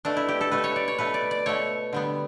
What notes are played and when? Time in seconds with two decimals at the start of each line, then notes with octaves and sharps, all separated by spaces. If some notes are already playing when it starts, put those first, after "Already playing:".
0.05 B2 A3 D4
0.17 E4
0.29 G4
0.41 A4
0.51 B2 A3 B4
0.64 C#5
0.76 D5
0.88 C#5
0.98 B2 A3 B4
1.14 D5
1.31 D5
1.46 B2 A3 C#5
1.93 D3 G3 B3